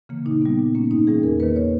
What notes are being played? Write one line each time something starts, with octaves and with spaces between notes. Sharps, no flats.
C#3 E3 A#3
A#2 D#4
G3 B3
A#2
A#3 C#4
G#2 D#4
E3 G3 C#4 G#4
E2 A#4
D#3 A#3 B4
C#5